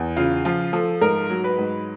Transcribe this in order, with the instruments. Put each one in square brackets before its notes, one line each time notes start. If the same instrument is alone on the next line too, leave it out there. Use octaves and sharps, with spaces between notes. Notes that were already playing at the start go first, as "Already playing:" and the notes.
Already playing: [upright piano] E2
C#3 F4
F3 F4
F3 A4
G#2 A#4
F#3
B4
G#2